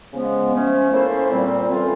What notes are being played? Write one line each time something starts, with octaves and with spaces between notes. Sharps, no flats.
C#3 F3 G#3 B3
F3 A3 C#4
A#3 C#4 E4 A4 C5
A#2 G3 C4
E3 A3 C#4 F4